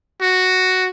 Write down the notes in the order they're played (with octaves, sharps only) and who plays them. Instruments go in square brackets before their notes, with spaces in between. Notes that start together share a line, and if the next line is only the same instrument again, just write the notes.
[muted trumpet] F#4